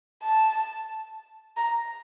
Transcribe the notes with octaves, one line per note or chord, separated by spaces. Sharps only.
A5
A#5